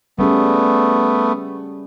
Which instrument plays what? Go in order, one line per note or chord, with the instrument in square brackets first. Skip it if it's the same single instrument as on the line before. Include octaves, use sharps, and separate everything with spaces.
[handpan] G3 C#4 G#4 [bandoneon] A3 B3